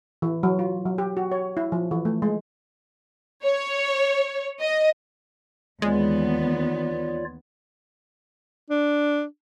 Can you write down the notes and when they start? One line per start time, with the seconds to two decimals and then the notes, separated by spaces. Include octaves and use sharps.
0.22 E3
0.43 F#3
0.59 F4
0.86 F#3
0.98 G4
1.17 F#4
1.32 C#5
1.57 E4
1.72 F3
1.91 E3
2.05 A3
2.22 G#3
3.43 C#5
4.60 D#5
5.82 D#2 E3 G#3 B3 F4 C#5 D5
8.70 D4